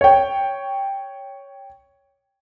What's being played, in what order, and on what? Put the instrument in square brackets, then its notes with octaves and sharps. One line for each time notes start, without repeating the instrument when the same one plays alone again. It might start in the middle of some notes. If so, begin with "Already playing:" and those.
[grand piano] C#5 G5